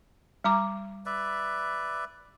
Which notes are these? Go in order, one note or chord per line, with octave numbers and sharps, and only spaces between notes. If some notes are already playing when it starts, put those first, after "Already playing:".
G3 A#5 D6
B4 D5 E5